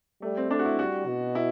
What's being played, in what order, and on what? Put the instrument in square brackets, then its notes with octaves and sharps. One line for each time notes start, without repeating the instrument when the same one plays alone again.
[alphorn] G3 [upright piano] A3
[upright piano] C4
[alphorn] A3 [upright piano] D4
[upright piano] F#4
E4
[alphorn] G3 [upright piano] F#4
[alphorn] B2
[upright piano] E4